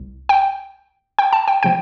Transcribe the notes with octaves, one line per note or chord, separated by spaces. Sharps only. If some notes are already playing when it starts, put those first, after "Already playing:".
Already playing: C2
G5
G5
A5
G5
C3 F3 G5